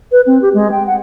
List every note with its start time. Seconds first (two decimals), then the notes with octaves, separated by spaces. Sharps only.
0.12 B4
0.27 C4
0.42 G4
0.54 G#3
0.71 G5
0.87 F#5